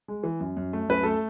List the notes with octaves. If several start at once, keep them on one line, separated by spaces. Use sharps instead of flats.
G#3
E3
F#2
F#2
A3
F#2 B4
A3 A4